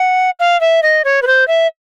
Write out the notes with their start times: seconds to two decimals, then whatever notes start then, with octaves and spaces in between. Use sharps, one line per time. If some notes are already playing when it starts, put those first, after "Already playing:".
Already playing: F#5
0.40 F5
0.61 E5
0.83 D#5
1.05 C#5
1.22 B4
1.27 C5
1.48 E5